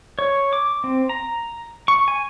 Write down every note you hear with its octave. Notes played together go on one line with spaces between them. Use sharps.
C#5
D6
C4
A#5
C#6
G#5